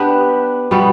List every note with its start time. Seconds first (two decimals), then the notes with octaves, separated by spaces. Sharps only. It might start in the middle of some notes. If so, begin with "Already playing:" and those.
Already playing: B3 D4 G4 B4
0.71 B2 G3 B3